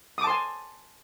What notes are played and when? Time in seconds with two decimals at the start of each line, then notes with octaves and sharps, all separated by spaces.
0.18 D#6
0.21 D6
0.24 A5
0.27 C6
0.30 G#5